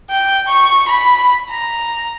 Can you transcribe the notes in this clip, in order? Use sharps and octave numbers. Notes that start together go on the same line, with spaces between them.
G5
C#6
B5
A#5